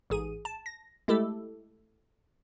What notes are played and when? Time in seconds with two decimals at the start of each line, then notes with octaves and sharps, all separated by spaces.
0.10 A1 G#2 G#4 D#7
0.45 A5
0.66 A#6
1.08 G#3 A3 E4 G4 A4